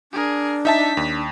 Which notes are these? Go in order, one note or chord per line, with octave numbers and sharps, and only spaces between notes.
D4 G#4 A#4
D#4 E5 A5 B6
D#2